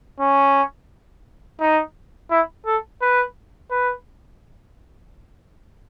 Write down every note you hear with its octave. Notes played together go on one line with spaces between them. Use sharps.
C#4
D#4
E4
A4
B4
B4